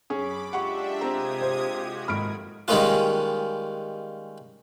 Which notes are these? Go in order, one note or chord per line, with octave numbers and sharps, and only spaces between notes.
F#2 C#4 G#4 B5 D6
G#3 D4 F4 G4 E5 F#5 C#6
C3 C4 A#5 D#6 G#6
C5
F#4
G#1 A#2 D3 D#3 F3 B5 F6 D7
D#3 G3 G#3 A#3 C#4 F4